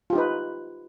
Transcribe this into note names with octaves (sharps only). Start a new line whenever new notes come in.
D#4 F4 G4 B4